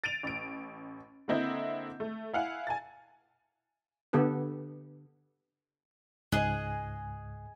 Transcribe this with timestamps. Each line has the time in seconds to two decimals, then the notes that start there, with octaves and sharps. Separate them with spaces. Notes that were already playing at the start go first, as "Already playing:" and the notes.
0.04 A6 D7 D#7 F7
0.23 A1 D7
1.28 D3 A#3 C4 E4 D#5 G6
2.00 A3
2.33 E4 F5 F#5 G#5
2.67 G#5 A5 A6
4.13 D3 B3 G4 A4 B4
6.32 C#2 G#2 G#4 D#5 F#6